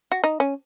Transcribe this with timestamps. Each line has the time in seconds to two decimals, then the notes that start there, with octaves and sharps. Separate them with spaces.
0.12 F#4
0.24 D#4
0.40 C#4